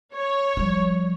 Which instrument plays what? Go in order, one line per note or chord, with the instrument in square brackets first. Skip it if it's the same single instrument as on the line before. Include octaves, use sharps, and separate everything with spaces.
[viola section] C#5
[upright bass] F3 G3